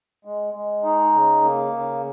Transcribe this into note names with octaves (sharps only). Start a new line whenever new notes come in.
G#3
G#3
D#4
C#3
A#3
C#3